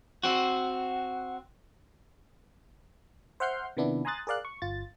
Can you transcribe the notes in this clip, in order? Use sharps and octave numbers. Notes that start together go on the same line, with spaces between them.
C4 F#4 F#5
C5 E5 F#5 F6 G6 C7
C3 D#3 B3 D4 E4
G#5 A#5 C6 D#6 F#6 A6
G#4 A#4 D5 F5 F#6
C#6
G1 F4 A6